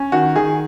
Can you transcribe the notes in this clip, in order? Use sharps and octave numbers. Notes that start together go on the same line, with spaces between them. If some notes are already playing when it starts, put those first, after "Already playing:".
Already playing: C#4
D#3 F#4
D#3 G#4